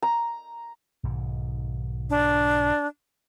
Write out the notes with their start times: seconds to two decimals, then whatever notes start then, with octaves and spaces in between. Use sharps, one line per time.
0.02 A#5
1.03 B1 G#2 D#3
2.10 D4